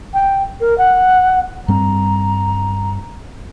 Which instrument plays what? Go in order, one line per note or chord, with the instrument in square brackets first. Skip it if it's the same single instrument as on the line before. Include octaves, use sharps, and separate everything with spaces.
[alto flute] G5
A#4
F#5
[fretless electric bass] G2 G3 C4 [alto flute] A#5